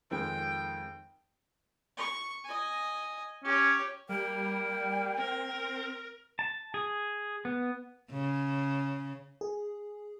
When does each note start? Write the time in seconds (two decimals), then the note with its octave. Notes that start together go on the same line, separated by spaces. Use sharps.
0.11 F2 D#3 G#3 G5
1.97 C#6
2.44 D#5 G#5
3.44 C#4 G4 C#5
4.09 G3 A#3 G5
5.18 C4 A#4
6.39 A5
6.74 G#4
7.45 B3
8.11 C#3
9.41 G#4